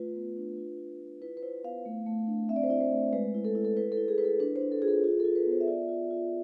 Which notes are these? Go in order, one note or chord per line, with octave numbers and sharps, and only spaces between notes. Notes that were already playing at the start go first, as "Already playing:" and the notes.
Already playing: A3 F4 B4
B3
D4
F4
F4
F4
E4 B4
B4
E4 C5
B3 F5
A3
A3
D4
C4 E5
D5
C5
E4 D5
C5
A3
G#3 B4
E4
A4
E4
A4
E4 B4
A4
E4
G#4
E4 B4
A4
D4 B4
C5
D4
A4
F4 G#4
A4
F4 G#4
A4
F4
B4
B3
C5
E5
F4 D5
F4
F4